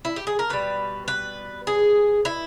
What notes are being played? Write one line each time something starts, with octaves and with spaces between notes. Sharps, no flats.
E4
G4
G#4
A#4
B2 G3 B4
B4
G#4
E4